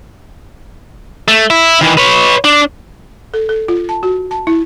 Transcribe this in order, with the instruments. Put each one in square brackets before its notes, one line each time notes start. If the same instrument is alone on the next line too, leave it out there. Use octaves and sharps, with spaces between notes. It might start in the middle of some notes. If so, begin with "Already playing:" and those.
[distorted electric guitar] A3
E4
D#3 E3
B4 C#5
D4
[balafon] A4
A4
F4
A5
F#4
A5
E4